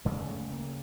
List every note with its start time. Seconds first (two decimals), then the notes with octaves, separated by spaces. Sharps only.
0.05 D2 C#3 G#3
0.29 A3
0.52 A#3